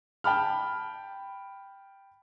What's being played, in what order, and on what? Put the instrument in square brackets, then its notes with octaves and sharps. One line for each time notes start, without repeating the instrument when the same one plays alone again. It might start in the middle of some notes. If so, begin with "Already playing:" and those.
[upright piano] G5 A5 B5 F6